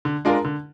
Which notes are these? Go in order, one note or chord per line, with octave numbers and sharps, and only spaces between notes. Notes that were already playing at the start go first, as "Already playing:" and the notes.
D3
G#3 D4 F4 A#4
D3